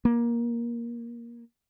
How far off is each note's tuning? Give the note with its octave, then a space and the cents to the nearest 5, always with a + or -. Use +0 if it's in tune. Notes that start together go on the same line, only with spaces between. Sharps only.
A#3 +15